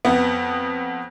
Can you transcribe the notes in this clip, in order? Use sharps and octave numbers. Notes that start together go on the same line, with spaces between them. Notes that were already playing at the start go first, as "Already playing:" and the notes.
F2 B3